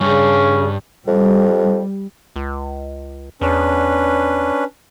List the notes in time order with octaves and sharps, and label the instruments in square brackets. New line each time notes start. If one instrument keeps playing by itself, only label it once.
[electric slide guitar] G2 [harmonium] C#3 [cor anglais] C#4
[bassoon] F2 [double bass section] G3
[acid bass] C#2
[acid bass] E2 [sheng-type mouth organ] C#4 D4 B4